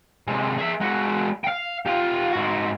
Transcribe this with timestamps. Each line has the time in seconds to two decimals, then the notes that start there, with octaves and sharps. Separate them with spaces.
0.27 C3 G#3
0.58 G#4 E5
0.81 G#3 F#4
1.44 F5 G5
1.86 F4 G4
2.33 G#2 F#4